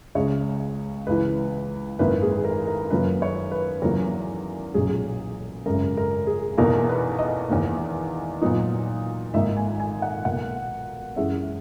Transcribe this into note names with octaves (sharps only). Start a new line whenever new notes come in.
C#2 C#3 G#3 C#5
C#2 C#3 E3 B4
G#1 F#2 D#3 A#3 E4 B4
G#4
A#4
A#4
F#2 D#3 F#3 A#3 B4
C#5
B4
E2 D#3 F#3 A#3 C#4 A#4
B1 A#2 F#3 C#4 G#4
G#1 F#2 C#3 A#4
A#4
G#4
E2 B2 A#3 D#4 A#4
B4
D#5
E2 D#3 A#3
A#2 F#3 B3 D#4
G#1 G#2 D#3 A#3 D#4 E5
G#5
G#5
F#5
B1 B2 A#3 F#5
F#2 E3 G#3 C#4 E5